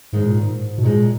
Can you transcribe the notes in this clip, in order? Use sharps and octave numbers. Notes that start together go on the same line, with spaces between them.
D#2 G#2 D#3 G#3
A#2
G#2
B2
D#2 A#2 D#3 G#3